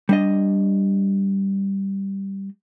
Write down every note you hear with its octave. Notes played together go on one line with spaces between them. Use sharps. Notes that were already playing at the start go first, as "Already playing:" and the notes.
G3 D4 D#5